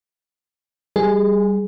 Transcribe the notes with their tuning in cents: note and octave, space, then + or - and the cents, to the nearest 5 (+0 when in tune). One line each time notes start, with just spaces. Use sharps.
G3 +0 G#4 +0